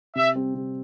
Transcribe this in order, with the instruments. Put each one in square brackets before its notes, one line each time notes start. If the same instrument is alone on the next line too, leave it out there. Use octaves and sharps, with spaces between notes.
[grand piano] C3 [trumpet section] E5
[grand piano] G3 C4
C3